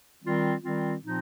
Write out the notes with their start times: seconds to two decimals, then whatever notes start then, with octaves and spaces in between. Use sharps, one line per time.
0.23 D#3 G3 C4 F4
0.63 D#3 G3 C4 F4
1.03 A#2 F3 C4 D#4